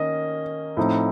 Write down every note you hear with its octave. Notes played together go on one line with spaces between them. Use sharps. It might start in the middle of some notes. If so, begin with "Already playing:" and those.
Already playing: D#3 A#3 C#4 D#5
A2 F3 C4 D#4